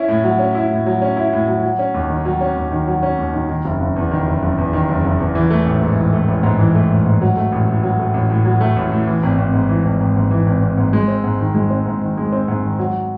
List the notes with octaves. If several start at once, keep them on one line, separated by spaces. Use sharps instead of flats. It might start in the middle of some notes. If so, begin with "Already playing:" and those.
Already playing: C#4 E4
A2
F#3
C#4
E4
A2
F#3
C#4
E4
A2
F#3
F#3
C#4
D#2
D#3
F#3
C#4
D#2
D#3
F#3
C#4
D#2
D#3
D#3
F#1
F#1
E2
D#3
F#1
F#1
E2
D#3
F#1
F#1
E2
E3
A3
A1
G#2
E3
A3
A1
G#2
E3
A3
A1
G#2
F#3
A3
A1
A2
F#3
A3
A1
A2
F#3
A3
A1
A2
E3
G#1
G#1
G#2
E3
G#1
G#1
G#2
E3
G#1
G#1
G#2
G#3
C4
G#2
D#3
G#3
C4
G#2
D#3
G#3
C4
G#2
D#3
F#3